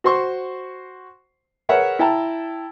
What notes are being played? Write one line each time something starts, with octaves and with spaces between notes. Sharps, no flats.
F#4 C5 C6 C#6
G#4 A#4 B4 C#5 E5 F#5
E4 G5 A5 A#5